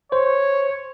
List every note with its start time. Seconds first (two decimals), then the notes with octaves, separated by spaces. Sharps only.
0.12 C5 C#5